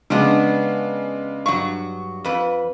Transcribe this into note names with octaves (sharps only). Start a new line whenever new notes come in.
C#3 G#3 B3 C#4 D4
G2 F#3 C#6
F2 B4